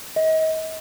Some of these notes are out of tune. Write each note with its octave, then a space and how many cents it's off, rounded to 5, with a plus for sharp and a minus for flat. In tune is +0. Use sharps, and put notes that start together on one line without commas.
D#5 +35